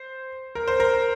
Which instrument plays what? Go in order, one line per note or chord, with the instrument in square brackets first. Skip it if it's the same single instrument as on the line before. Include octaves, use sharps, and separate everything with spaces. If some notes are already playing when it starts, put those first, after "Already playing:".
Already playing: [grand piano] C5
A#4
C5
A#4